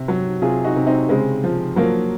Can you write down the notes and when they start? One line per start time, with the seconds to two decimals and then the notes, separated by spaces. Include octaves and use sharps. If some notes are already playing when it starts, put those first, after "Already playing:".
Already playing: C3
0.08 F#3
0.42 C3 F4 G#4
0.65 D#4 F#4
0.76 C3
0.87 C4 D#4
1.09 C#3 G#3 C4
1.44 F3
1.76 F3 F#3 A#3